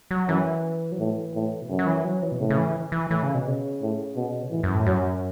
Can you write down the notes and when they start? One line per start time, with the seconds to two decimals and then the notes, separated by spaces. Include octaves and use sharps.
0.11 F#3
0.28 F#2 E3
0.92 F#3
0.99 A2 E3
1.35 A2
1.62 B2
1.69 F#2 C#3
1.79 F#3
1.87 E3
2.05 F#3
2.22 E3
2.32 B2
2.40 A2 C#3
2.50 C#3
2.58 E3
2.92 E3
3.10 A2 E3
3.23 C#3
3.35 B2
3.48 C#3
3.81 A2
4.16 B2
4.42 B2
4.51 A2 E3
4.63 F#2
4.75 A2
4.86 F#2 F#3